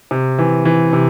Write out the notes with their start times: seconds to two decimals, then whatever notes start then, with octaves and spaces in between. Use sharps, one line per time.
0.11 C3
0.39 E3
0.65 E3
0.93 C3